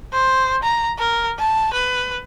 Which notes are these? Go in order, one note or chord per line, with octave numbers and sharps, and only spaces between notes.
C5
A#5
A#4
A5
B4